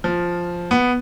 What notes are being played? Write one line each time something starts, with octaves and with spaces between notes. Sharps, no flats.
F3
B3